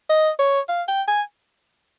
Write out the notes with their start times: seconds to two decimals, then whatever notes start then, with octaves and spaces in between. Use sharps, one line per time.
0.10 D#5
0.39 C#5
0.69 F5
0.88 G5
1.08 G#5